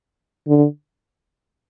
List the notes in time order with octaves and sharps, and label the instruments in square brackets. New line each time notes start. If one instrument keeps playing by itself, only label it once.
[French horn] D3